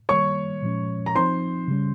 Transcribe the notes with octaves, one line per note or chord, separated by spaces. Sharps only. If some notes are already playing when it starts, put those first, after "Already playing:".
D#3 G3 A#3 C#5 C#6
A#2 F3 G#3 C#4
A#5
F3 C4 D#4 C5 C6
C#3 G3 C#4